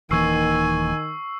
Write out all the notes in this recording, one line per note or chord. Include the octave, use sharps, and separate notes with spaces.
D#1 D#3 E3 A#3 G#5 C#6 E6 C7